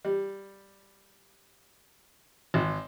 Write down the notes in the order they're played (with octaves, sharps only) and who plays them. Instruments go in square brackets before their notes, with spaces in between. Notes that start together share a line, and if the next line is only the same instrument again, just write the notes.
[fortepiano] G3
G#1